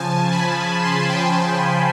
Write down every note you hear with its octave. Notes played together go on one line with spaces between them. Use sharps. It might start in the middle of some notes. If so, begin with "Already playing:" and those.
Already playing: C#3 F3 G#5 A5
B5
C6
G5